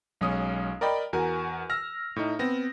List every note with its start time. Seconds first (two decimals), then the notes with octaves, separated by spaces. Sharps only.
0.21 B1 G#3 C#4 D#6
0.81 A#4 D5 D#5 G5 B5
1.13 E2 F#4 A#4 G#5
1.70 E6 F6 A#6
2.16 A2 D#4
2.39 B3 C4 A#6